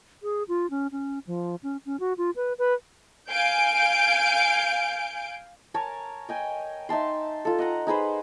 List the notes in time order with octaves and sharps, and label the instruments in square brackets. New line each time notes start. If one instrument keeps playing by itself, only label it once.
[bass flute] G#4
F4
C#4
C#4
F3
C#4
C#4
F#4
F4
B4
B4
[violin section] F5 G#5 G6 D7
[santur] A#4 C#5 G#5 A5
D#5 G5 G#5
D#4 E5 A5 C6
F4 A4
D#5 F#5 A#5
D#4 G#4 B4 C5